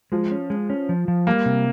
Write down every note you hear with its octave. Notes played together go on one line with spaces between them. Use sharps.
F3 G#3
C#4
G#3
C#4
F3
F3
G3 A#3
C3